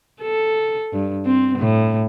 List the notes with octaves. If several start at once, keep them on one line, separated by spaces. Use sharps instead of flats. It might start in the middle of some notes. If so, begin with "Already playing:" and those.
A4
G2
C4
A2